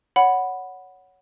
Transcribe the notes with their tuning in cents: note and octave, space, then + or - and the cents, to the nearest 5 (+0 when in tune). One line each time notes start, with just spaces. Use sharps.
C#5 +15 F#5 +0 B5 +0